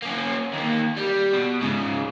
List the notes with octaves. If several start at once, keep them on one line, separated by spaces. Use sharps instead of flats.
A#3 C#4
D#2 A#3
G3
B2
G#2 C#3